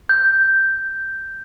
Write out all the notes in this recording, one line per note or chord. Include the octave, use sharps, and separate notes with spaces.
G6